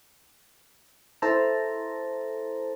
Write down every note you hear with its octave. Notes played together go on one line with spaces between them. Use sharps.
E4 A4 C5 A5 A#5